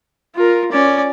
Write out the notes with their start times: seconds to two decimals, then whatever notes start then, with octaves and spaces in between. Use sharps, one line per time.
0.36 F4 A#4
0.72 C#4 D5